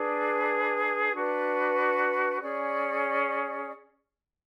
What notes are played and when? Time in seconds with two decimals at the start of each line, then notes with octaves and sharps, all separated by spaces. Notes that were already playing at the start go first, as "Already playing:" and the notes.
Already playing: D4 G#4 B4
1.13 D4 F#4 B4
2.41 C#4 G#4 D5